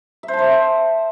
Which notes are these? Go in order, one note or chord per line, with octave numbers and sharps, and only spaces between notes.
E5
C5
A5
C5
E5